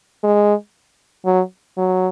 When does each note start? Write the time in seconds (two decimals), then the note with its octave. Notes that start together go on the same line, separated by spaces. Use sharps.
0.24 G#3
1.25 F#3
1.78 F#3